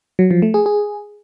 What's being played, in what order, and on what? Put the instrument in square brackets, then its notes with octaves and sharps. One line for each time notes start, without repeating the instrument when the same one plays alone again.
[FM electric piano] F#3
F3
A3
G#4
G#4